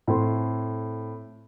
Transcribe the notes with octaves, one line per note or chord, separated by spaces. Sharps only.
A2 C4 A4 C6